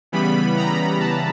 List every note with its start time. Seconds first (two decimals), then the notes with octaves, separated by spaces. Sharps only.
0.12 C#3 E3 G3 B3 B5
0.57 A#5
1.00 A5